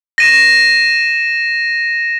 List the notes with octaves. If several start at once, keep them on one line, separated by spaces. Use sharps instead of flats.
A#6 D#7 E7